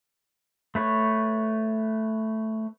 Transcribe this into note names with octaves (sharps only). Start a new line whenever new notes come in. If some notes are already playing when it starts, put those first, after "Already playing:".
A3 B4 C#5